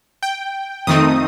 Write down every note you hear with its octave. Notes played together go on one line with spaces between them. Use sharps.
G5
F2 D#3 A3 C4 D#4 D#6